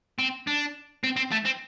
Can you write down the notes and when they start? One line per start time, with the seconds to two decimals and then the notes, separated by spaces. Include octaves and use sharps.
0.19 C4
0.47 D4
1.04 C4
1.17 C4
1.32 A3
1.46 C4